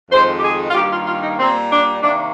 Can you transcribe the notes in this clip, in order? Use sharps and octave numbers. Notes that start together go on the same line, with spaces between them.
F2 D#3 G#3 C5
G4
G#4
F4
G2 D#3 A#3 G4
F4
F4
D#4
A#2 G3 A#3 C4
D4
C3 D#3 A#3 D4